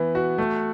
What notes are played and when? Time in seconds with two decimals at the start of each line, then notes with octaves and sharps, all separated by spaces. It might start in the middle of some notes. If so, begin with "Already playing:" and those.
Already playing: E3 B3
0.15 F#4
0.38 A3